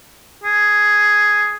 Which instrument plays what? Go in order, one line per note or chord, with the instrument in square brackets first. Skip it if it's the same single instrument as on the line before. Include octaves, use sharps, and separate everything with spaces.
[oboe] G#4